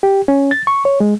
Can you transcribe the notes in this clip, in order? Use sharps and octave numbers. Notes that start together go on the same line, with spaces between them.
G4
C#4
A6
C#6
C#5
G#3